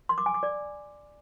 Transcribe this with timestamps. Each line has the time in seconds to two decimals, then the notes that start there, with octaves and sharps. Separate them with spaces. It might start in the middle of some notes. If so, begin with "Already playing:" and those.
0.09 C6
0.18 D6
0.26 G#5
0.34 D6
0.43 D5